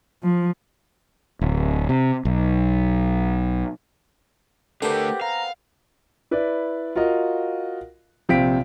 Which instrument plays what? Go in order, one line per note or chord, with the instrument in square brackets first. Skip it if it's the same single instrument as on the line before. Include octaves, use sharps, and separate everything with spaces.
[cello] F3
[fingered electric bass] D1
C3
B1
[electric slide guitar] A3 D4 [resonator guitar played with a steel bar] B3 C4 [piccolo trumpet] G4 [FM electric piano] A4 A#4
[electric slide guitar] F5 [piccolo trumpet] A#5
[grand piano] E4 B4 D5
F4 F#4 A#4 D#5 F5
A#1 C3 F5 G5 B6 D7